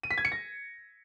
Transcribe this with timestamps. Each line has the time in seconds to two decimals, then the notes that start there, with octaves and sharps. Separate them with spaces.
0.03 D#7
0.11 B6
0.18 G#6
0.25 C#7
0.32 A#6